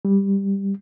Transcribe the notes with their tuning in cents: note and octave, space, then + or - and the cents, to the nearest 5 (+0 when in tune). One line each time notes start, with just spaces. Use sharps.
G3 +10